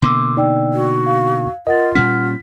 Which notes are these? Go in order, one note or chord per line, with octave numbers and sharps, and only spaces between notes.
B2 D3 A#3 C6 D6 E6
D#4 D5 G5 E6
F#4
F5
F4 A#4 D#5 F#5 A6
A#2 G3 C#4 F#5 F6 B6